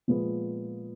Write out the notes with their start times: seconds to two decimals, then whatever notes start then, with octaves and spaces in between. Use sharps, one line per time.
0.08 A#2 F3 G#3 B3